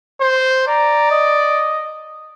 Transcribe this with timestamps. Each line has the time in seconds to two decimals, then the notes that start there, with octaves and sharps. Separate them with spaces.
0.20 C5
0.68 D5 A#5
1.11 D#5